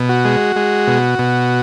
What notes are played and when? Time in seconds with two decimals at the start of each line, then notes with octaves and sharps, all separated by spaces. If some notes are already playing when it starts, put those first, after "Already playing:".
Already playing: B2
0.09 F#4
0.25 G#3
0.56 G#3
0.87 B2
1.19 B2